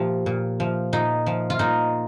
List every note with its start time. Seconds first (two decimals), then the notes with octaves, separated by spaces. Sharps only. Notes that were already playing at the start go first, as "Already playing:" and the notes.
Already playing: A#2 F3 F4 G4
0.26 A#2
0.60 F3
0.93 A#2 D#4
1.26 F3
1.50 F4
1.59 A#2 D#4